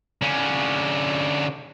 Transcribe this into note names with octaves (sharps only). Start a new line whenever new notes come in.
D3 C#4